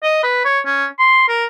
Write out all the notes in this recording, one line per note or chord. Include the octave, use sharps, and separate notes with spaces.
D#5
B4
C#5
C#4
C6
A#4